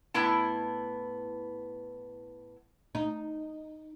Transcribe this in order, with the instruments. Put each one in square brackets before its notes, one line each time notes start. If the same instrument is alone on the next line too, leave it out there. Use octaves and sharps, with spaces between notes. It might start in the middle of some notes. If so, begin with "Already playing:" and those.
[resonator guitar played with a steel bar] A2 B3 E4 A5
[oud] D#4